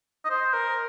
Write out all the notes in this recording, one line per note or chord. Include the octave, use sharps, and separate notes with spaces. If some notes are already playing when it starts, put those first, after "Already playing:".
D#5
C5
A#4